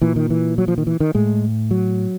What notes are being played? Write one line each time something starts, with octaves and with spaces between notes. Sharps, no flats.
A#2 E3
D#3
E3
F#3
F3
D#3
E3
D#3
A2 G#3
F#3